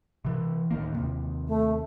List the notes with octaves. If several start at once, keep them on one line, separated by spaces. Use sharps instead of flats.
C3 E3
D1 D#3 A#3
D#2 C3
A3